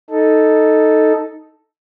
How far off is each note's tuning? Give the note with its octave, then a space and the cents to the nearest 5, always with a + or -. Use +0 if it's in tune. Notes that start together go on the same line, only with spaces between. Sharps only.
D#4 +5 A4 +0